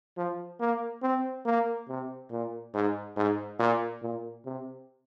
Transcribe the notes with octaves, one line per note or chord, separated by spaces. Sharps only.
F3
A#3
C4
A#3
C3
A#2
G#2
G#2
A#2
A#2
C3